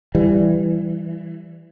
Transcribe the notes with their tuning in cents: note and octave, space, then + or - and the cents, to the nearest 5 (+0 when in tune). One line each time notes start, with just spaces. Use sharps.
E3 +10 G3 +0